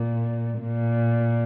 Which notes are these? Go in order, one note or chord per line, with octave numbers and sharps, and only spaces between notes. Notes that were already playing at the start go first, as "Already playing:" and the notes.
Already playing: A#2
A#2